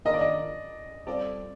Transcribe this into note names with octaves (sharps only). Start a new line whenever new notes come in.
D#3 A#3 D4 F4 A#4 D#5
D5
D#5
G3 C4 F4 A4 D5